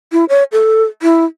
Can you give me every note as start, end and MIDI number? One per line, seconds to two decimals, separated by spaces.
0.12 0.25 64
0.29 0.44 73
0.52 0.83 69
1.02 1.25 64